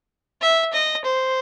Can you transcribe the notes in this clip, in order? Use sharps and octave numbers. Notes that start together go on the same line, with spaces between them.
E5
D#5
C5